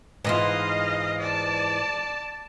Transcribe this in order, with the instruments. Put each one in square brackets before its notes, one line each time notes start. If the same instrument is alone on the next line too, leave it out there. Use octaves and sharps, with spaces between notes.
[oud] G#2 E3 F4 [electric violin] D#5 F5
[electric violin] D5 A5